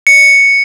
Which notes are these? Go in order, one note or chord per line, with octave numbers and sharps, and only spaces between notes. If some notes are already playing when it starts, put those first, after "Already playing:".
C#7